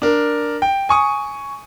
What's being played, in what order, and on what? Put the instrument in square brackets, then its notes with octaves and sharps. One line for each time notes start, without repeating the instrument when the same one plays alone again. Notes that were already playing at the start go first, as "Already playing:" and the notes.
[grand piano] D4 A#4
G5
G#5 C#6 D#6